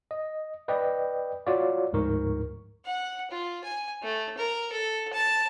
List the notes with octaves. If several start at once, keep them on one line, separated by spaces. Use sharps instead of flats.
D#5
B4 D5 D#5 G5
F4 F#4 C#5 D5 F5
D2 G#2 F3 A#4 C#6
F#5
F4
G#5
A3
A#4
A4
A5